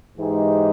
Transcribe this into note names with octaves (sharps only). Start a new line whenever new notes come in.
G#2 E3 G#3 D#4 G4